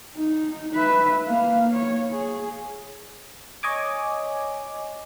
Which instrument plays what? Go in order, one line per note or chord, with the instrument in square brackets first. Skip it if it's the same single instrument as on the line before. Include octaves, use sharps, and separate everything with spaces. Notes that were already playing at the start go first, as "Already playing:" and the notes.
[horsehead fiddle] D#4
B4 E5
A#3 F5
C#5
G#4
[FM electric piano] C#5 D#5 G#5 D6